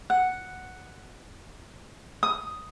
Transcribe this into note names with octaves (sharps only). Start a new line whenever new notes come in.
F#5
D#6